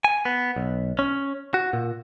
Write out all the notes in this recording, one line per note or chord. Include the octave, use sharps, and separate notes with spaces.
G#5
B3
B1
C#4
F#4
A#2